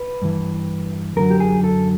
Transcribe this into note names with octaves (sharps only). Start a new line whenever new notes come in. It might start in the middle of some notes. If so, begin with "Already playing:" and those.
Already playing: B4
G2 E3
F#2 D3 F#3 A#4
G4
G#4
A4